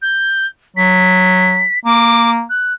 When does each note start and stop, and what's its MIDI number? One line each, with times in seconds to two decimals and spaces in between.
0.02 0.47 91
0.77 1.64 54
0.77 1.79 95
1.85 2.43 58
1.85 2.30 86
2.49 2.73 90